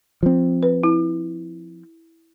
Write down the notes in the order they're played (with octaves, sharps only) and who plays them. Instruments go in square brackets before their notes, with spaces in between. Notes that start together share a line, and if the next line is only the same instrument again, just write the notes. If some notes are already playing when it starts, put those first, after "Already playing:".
[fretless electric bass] F3 C4
[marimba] B4
E4